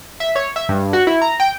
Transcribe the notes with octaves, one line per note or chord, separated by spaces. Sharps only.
E5
C#5
E5
G2
F#4
E4
A#5
G5